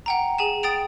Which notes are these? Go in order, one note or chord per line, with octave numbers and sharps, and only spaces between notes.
F#5 G5 A#5
G#4 G#5 E7
G5 D#6 A6 D7 F7